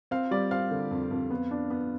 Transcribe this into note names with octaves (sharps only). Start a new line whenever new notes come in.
C4 F5
G3 D5
C4 F5
D3
F2
F2
B3
D4
B3